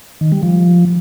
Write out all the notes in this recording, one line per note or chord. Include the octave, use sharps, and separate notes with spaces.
D#3
G3
F3